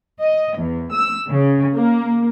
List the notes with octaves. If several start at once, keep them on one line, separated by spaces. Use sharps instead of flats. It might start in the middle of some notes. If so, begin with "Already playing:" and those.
D#5
E2
E6
C#3
A#3